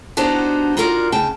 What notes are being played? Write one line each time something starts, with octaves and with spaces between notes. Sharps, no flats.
B3 D4 D#4 F#4 G4 C5
D#4 F4 F#4 A#4 B4 D5
D2 C#3 G5 A5